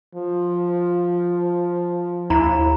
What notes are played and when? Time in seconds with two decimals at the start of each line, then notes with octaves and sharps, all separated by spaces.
0.15 F3
2.30 D#2 E4 A#5 B5